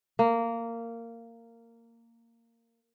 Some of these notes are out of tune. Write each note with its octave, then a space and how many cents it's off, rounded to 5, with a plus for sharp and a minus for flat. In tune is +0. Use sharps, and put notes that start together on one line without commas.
A#3 -15